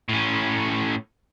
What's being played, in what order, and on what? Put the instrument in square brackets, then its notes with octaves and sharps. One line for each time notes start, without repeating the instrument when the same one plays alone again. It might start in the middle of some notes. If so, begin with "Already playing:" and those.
[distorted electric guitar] A2 C#4